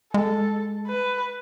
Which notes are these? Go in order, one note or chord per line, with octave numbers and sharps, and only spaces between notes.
G#3 A4
B4